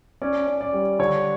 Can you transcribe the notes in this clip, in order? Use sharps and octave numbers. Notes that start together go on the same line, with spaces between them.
C#4 D5
C#4
D5
G3
D3 C#5